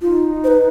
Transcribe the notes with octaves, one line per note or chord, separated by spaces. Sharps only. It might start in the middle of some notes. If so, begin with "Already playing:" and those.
D#4 F4
C5
B4